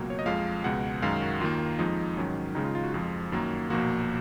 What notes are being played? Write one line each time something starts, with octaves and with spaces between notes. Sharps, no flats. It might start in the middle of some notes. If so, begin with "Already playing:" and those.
Already playing: C#2 B2 F#3 A#3 C#5
C#5
D#5
F2 F3 G#3 F5
C#2 B2 G#3 F#5
F#2 D#3 G#3 F5
F#4
D#2 D#3 A#3 F4
F2 F3 G#3 D#4
G#2 D#3 F#3 C#4
C#2 C#3 G#3 D#4
F4
F4
F#4
F2 F3 G#3 F4
F#2 D#3 F#3 A#3
B1 A#2 F3 A#3 F#4